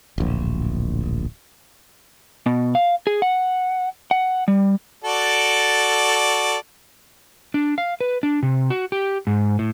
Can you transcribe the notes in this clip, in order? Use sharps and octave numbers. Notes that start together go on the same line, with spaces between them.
D1 A#1
B2
F5
G#4
F#5
F#5
G3
F#4 A4 D5
D4
F5
B4
D4
C3
F#4
G4
G#2
A2